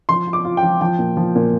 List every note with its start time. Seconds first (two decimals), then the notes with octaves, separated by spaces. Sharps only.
0.09 F3 C6
0.27 F4
0.33 D6
0.45 F4
0.57 G5
0.63 F3
0.81 F3 G5
0.99 A#2
1.17 F3
1.35 A#2